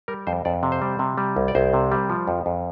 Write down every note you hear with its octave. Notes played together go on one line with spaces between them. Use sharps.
G3 A#4
F2 C5
F2 D5
C3
C5
G3
C3
G3
C2
D5
C2 C5
C3
G3
F3
F2
F2